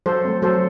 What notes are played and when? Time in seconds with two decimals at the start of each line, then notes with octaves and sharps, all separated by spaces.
0.06 F#3 A4 C5
0.25 A3 C4
0.42 F#3 A4 C5